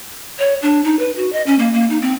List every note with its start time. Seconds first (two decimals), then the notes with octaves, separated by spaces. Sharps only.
0.39 C#5
0.62 D4
0.84 D#4
0.99 B4
1.16 F#4
1.33 D#5
1.46 C#4
1.59 A#3
1.73 A#3
1.90 D#4
2.02 C4